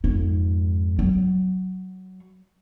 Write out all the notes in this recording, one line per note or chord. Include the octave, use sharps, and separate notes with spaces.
F2 G#2
F#3